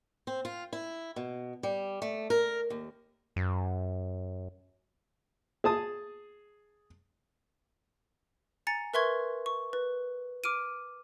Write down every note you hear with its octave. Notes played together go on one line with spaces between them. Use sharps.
C4
F4
E4
B2
G3
A3
A#4
D#2
F#2
G#4 A5 D#6
G#5 A#5 A6 C#7
A#4 B4 E5 C6 C#6 G#6
C#6
B4
D6 F6 D7 D#7